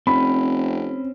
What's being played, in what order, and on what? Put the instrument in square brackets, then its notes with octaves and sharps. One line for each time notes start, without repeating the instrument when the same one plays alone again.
[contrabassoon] F1 [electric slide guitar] C4 C#4 [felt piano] B5